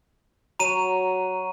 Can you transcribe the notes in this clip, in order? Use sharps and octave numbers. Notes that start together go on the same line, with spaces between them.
F#3 F#4 A#5 C#6 D#7